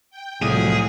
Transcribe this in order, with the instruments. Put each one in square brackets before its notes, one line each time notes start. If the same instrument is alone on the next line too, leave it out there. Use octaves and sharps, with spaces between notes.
[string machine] G5
[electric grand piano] C2 [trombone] A2 [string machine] F3 F#3 [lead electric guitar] G#4